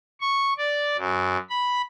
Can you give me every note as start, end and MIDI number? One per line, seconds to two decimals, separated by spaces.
0.21 0.53 85
0.58 0.97 74
0.98 1.37 42
1.50 1.82 83